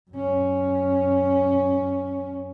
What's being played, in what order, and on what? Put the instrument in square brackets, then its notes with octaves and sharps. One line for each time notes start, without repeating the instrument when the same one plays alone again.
[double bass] F#2 C#4